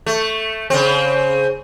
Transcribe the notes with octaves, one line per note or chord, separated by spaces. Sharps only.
A3
C#3 C4